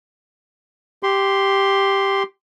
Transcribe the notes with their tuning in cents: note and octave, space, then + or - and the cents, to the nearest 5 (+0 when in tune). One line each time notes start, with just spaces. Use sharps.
G4 +0 C6 +0